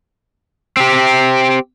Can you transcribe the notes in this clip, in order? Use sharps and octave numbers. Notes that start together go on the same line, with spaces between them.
C4 G4